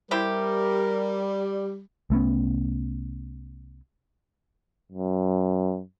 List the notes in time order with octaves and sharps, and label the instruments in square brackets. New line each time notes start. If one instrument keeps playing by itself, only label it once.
[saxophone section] G3 [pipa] C4 E4 G4 [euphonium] A#4
[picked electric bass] C2 A3 B3 C#4
[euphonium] F#2